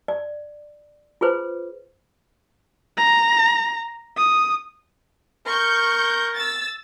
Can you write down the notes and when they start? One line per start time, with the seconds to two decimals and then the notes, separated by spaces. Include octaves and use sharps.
0.08 D5
1.21 F4 G#4 B4 C5
2.97 A#5
4.17 D#6
5.47 A#4 C#6 G6
6.36 E6 A6